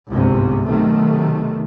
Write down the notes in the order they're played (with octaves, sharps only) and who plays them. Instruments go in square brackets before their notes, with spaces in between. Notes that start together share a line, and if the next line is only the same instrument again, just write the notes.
[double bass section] G1 C2 G#2 C3
B1 C3 D#3 A3